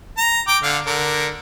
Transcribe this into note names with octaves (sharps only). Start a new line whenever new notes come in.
A#5
G5 D6
D3 F5
D3 A#4